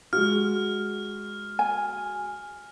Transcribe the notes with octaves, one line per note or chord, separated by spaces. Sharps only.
G#3 F#4 F6
G#5